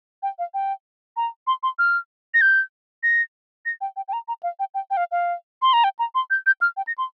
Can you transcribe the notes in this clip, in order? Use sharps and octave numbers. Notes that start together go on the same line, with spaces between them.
G5
F5
G5
A#5
C6
C6
F6
A#6
G6
A#6
A#6
G5
G5
G5
A#5
A#5
F5
G5
G5
G5
F5
F5
C6
A#5
G5
A#5
C6
G6
G6
F6
G5
A#6
C6